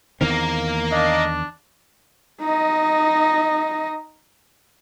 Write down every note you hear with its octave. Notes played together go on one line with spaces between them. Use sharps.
E2 D#3 A#3 C4 A#4
D4 D#5
D#4 D#5